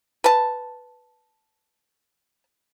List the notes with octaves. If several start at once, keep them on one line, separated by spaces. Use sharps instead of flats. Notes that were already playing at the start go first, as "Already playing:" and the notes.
B4 A5